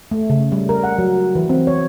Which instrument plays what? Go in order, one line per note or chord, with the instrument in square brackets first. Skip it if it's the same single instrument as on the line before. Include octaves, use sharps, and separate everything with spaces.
[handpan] A3
C#3
G3
A#4
F#5
F#3
E3
C4
C#5